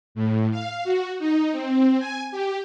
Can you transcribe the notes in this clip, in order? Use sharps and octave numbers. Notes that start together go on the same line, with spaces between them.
A2
F5
F#4
D#4
C4
G#5
G4